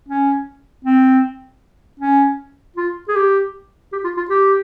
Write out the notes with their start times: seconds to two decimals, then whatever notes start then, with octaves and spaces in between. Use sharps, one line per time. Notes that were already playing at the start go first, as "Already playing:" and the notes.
0.08 C#4
0.84 C4
2.00 C#4
2.76 F4
3.08 G#4
3.15 G4
3.92 G4
4.04 F4
4.17 F4
4.30 G4